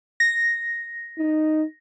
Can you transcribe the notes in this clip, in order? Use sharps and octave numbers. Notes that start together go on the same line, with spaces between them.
A#6
D#4